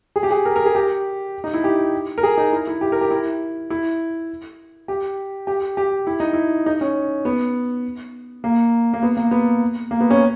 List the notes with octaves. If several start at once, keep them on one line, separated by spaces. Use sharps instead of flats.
G#4
G4
G#4
A#4
A#4
G#4
G4
D#4
E4
G4
A#4
G#4
D#4
E4
E4
G4
A#4
G4
E4
E4
G4
G4
G4
E4
D#4
E4
D#4
C#4
B3
A#3
A#3
B3
A#3
B3
A#3
B3
C#4